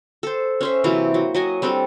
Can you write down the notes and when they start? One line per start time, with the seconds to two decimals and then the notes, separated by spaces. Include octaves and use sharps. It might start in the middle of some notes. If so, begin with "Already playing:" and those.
0.23 A4 C5
0.61 C#4 C5 E5
0.84 C3 E3 F#3 A#3
1.14 F#3
1.35 F#3 D#5 G#5
1.62 G3 C4 D4 A4